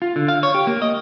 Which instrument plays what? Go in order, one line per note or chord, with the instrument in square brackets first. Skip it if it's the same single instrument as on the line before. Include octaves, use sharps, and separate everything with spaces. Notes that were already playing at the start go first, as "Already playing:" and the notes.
[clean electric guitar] F4
D3
F5
C#5
G4
A#3
D#5